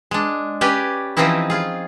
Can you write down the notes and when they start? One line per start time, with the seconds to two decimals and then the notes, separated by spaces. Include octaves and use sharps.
0.11 G#3 D4
0.61 C#4 G4 B4 D5 G#5
1.17 E3 F3 C4 C#4 D#4 E4
1.50 F4 G#4